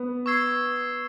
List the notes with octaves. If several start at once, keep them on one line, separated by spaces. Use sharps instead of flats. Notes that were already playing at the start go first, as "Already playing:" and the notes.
Already playing: B3
C#6 E6 G#6 C7